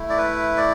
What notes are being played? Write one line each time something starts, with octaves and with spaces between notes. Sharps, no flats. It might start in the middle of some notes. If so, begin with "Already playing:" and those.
Already playing: A3 E4
D5
B4
D5